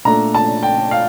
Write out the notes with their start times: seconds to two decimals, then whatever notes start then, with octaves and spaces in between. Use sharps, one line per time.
0.05 A#2 A3 D4 A#5
0.35 A5
0.63 G5
0.91 F5